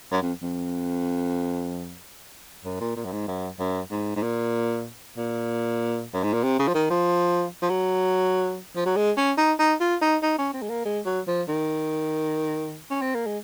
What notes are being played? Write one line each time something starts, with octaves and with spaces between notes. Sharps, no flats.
F#2
F2
F2
F#2
A#2
A#2
F#2
G#2
F#2
F#2
G#2
G#2
A#2
A#2
F#2
G#2
A#2
C3
C#3
F3
D#3
F3
F3
F#3
F3
F#3
G#3
C#4
D#4
D#4
F4
D#4
D#4
C#4
C4
G#3
A#3
G#3
F#3
F3
D#3
C#4
C4
A#3
G#3